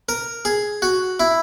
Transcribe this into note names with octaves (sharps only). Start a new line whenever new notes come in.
A#4
G#4
F#4
E4